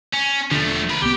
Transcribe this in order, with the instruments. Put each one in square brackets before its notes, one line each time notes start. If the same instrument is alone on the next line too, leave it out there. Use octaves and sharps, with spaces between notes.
[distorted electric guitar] C#4
[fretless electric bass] E1 D3 [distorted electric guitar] F3 A3
[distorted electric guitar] A#4 B5
[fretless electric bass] B1 B3 [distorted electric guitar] G4